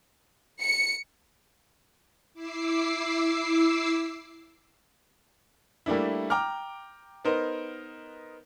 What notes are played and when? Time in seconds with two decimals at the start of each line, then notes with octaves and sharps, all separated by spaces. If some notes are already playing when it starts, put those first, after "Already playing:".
0.62 C#7
2.33 E4 D6 E6 C7
5.86 G3 A3 A#3 D4 E4
6.30 G5 A#5 D6 F6
7.25 B3 D#4 A#4 C5